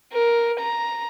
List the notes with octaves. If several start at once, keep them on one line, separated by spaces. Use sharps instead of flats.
A#4
A#5